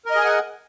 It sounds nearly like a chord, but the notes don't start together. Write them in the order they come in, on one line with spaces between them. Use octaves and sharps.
A#4 D#5 G#4 G#5 F#5